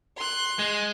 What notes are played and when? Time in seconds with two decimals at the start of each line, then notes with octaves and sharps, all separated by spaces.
0.17 C6 F#6
0.59 G#3